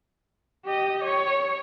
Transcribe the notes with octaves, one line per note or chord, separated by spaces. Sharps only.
G4 D#5
C#5